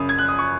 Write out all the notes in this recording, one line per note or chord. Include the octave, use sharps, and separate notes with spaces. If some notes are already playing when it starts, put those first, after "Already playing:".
Already playing: F#2 C#3 B5 D#6
G#6
F#6
D#6
C#6